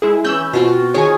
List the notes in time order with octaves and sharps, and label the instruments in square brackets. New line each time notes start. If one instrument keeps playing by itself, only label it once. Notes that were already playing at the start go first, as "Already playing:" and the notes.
[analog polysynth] G#3 E4 G#4
[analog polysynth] E3 E6 G6 [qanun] C#4 B5
[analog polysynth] B2 [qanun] C4 F4 C5 [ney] F#4
[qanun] D#3 G#4 [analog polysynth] C#5 G#5